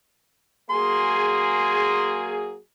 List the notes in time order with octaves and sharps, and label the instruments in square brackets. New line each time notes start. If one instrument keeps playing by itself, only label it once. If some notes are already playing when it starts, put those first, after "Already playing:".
[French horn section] F#3 A#3 G#4 [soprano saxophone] C6